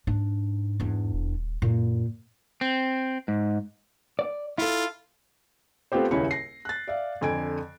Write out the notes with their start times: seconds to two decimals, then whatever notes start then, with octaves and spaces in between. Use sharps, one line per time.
0.07 G#2 D4
0.80 E2 D4
1.13 D#1
1.62 F#2 A#2
2.61 C4
3.28 G#2
4.19 D5
4.58 E4 F4 A4
5.92 A3 B3 C4 F4 G4 C5
6.11 D#1 C#2 E4 C#5 B5 C#7
6.31 A#6 C7
6.65 F#6 A6
6.88 D5 E5 F5
7.21 F2 D3 G#5 G#6 D7